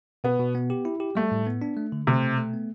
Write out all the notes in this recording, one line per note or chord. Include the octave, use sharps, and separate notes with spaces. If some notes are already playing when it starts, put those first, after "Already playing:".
B2 B3
B2
B3
G4
E4
G4
G3 A3
A2
B3
D4
A3
D3
C3 A3
B2
A3
B3